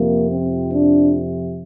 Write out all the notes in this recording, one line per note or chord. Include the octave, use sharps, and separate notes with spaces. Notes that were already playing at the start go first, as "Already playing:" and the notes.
Already playing: F2 C3 F3 A#3
C4
D4